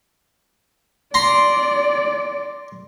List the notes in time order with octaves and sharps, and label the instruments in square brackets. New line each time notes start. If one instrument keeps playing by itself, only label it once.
[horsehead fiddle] D5 [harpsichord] A#5 C6